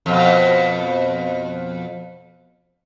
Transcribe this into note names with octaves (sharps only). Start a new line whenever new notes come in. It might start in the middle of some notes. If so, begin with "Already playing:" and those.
F2 B2